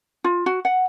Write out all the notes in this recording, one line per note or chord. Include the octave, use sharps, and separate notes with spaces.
F4
F#4
F#5